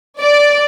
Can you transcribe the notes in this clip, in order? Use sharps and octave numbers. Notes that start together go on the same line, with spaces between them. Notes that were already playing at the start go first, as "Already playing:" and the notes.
D5